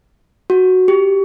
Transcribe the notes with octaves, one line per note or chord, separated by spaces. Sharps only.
F#4
G4